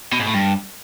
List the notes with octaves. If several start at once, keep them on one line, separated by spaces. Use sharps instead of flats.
B2
G#2
A2
G2